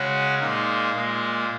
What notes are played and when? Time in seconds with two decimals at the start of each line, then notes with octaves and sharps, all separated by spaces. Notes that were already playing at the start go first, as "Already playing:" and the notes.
Already playing: C#3 G#3 C#4 F#4
0.40 A#2 G#3 A#3 D#4
0.95 A#2 G#3 A#3